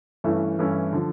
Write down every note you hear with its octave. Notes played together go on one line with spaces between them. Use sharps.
G2 E3 A3 C#4 E4
G2 E3 A3 C#4 E4
D3 F3